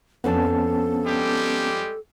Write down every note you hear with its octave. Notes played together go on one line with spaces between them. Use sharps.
F2 F3 B3 C#4 D4 A4 A5
G3 G#3 G4